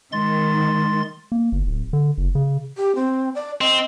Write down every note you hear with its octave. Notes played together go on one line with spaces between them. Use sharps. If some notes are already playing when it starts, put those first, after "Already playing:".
D#3 G#3 C6 A6
A#3
G1
D1
D3
F#1
C#3
G4
C4
D5
C4 D#5